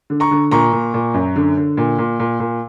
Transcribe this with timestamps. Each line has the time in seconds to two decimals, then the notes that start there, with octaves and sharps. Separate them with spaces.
0.10 D3
0.20 A#5 C#6
0.31 D3
0.51 A#2 A#5 C#6
0.73 A#2
0.94 A#2
1.14 F#2
1.36 D3
1.57 D3
1.77 A#2
1.98 A#2
2.20 A#2
2.40 A#2